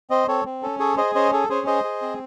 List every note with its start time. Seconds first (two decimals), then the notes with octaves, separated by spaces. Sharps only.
0.10 C4 C5 D#5
0.28 C4 A4 C#5
0.45 C4
0.62 C#4 A4
0.80 G#4 A4 C#5
0.97 G#4 C5 D#5
1.15 C#4 C5 D#5
1.32 G#4 A4
1.49 C#4 G#4 C5
1.67 G#4 C5 D#5
1.84 G#4
2.02 C4